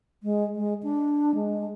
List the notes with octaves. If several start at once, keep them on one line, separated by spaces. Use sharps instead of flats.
G#3
G#3
D4
G#3